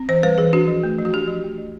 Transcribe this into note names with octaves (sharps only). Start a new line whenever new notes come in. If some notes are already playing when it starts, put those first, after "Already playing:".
Already playing: C4
E3 C5
G3 B4
E3 G#4
D4 F#4
F3
A3
F3
F#4
D4 G4
F3
A3
F3